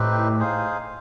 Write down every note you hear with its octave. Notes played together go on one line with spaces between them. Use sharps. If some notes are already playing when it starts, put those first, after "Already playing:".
Already playing: A2 C4 D#4 G4 B4
D#4 G#4 C5 F5